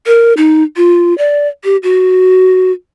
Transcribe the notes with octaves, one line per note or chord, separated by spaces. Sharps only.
A#4
D#4
F4
D5
G4
F#4